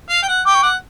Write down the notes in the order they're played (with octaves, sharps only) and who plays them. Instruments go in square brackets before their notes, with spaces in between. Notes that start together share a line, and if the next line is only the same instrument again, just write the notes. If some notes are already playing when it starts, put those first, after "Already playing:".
[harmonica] F5
G5
F#5
[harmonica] G5 [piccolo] D6
[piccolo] C#6
[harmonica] F#5 [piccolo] D6